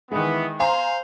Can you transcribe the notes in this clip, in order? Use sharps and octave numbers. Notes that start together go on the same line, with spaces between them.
D#3 E3 G#3 B3
C5 F5 G#5 A#5 C6